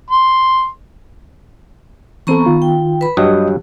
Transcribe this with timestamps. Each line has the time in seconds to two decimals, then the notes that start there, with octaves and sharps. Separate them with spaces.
0.10 C6
2.27 E3 B3 C4 A4 A#5 C#6
2.46 D#3 F4
2.62 G5
3.01 B4 B5
3.17 G2 F#3 G4 D#5 D#6